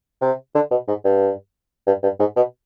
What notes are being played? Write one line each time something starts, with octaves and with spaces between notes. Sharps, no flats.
C3
D3
B2
G#2
G2
G2
G2
G#2
B2